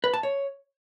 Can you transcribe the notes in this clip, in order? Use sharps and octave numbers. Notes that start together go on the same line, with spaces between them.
B4
A5
C#5